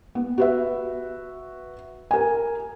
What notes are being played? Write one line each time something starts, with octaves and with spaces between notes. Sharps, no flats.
B3
F#4 B4 E5
A#4 G#5